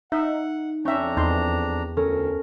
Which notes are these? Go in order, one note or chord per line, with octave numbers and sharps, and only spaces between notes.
D#4 E5 F#5
F2 C#4 D4 E5 G5 A#5 C#6 G6
E2 D#4 C6
D2 C#4 A4 A#4